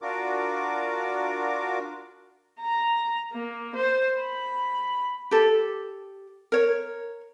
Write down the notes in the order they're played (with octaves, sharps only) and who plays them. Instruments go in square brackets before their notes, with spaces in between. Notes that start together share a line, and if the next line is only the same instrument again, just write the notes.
[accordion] D4 F4 F#4 A#4 D6
[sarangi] A#5
A#3
C5
B5
[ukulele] G4 A4
A#4 C#5